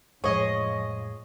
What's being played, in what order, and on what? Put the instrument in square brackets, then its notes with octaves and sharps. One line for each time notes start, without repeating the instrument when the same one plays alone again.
[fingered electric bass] F2 A2 G#3 [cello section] F3 [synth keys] G#4 D#5 [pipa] C#5